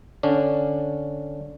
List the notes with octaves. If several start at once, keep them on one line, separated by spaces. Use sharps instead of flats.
D3 C#4 D4